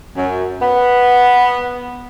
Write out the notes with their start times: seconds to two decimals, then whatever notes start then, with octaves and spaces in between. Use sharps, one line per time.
0.16 F#2
0.62 B3